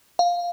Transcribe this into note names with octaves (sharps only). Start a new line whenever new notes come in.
F5